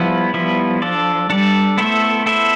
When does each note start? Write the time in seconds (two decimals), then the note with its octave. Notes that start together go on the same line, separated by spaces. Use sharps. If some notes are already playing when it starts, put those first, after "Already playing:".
Already playing: F3 G3 B3 E4 B4
0.34 F3 G3 B3 E4 B4
0.82 D4 A4 D5
1.29 G3 D4 A4 D5
1.78 A3 B3 E4 A4 C5 E5
2.26 B3 E4 A4 C5 E5